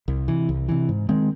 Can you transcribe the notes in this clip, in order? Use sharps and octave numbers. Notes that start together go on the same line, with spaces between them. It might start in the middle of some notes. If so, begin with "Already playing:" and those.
C2
C3 E3
C2
C3 E3
G#2
D#3 G#3 C4